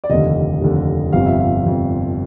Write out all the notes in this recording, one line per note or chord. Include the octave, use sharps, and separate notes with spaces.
D5
F1 D#2 D3 D#5
F1 D#2 D3
G1 F2 C3 F3 F5
E5
F5
G1 F2 C3 F3